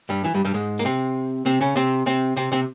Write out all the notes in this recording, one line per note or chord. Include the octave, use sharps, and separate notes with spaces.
G2 G3
E3
G2 G3
G2 G3
G#2 G#3
A#3
C3 C4
C3 C4
C#3 C#4
C3 C4
C3 C4
C3 C4
C3 C4